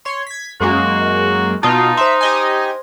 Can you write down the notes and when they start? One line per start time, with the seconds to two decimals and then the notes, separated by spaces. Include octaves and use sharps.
0.05 C#5 C6
0.27 G#6 B6
0.60 F#2 G#3 A#3 F#4
1.63 B2 D#4 F4 A5 D#6
1.97 C5 E5 C6
2.21 G4 D#5 G#5